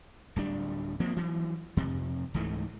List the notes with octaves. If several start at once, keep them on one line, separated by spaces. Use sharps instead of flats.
D1 G3 D4
F3 A#3 C4
E3 F#3
F2 C3
C#2 G#2 E3 A3